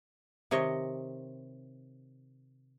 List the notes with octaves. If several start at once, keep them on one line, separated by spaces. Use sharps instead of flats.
C3 D#3 C#5 D#5